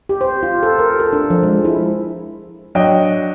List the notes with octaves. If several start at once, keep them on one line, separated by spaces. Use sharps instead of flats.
G4
C5
F4
A4
A#4
A4
D4
F3
G#3
E4
F#3 D4 D#5 G5